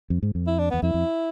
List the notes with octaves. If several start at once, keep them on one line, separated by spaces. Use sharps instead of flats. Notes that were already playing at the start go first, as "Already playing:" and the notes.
F2
G#2
F2
E4
D4
E2 B3
F2 E4
F2